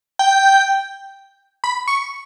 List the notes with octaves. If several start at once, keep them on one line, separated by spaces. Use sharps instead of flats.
G5
B5
C#6